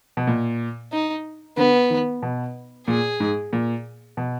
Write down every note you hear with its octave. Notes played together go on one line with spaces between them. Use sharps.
B2
A#2
D#4
D3 B3
D#3
B2
A#2 G#4
G#2
A#2
B2